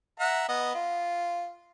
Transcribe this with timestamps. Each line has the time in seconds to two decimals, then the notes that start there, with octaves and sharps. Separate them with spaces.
0.20 E5 F#5 A#5
0.48 B3 D#5 F#5
0.75 F4